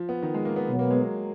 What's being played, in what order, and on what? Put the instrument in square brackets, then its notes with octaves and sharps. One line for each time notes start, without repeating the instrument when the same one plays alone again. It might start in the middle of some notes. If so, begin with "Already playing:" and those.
Already playing: [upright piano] F3
B3
D#3
G#3
A#3
B3
[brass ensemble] B2 F#3 B3
[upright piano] A#3
G#3
F#3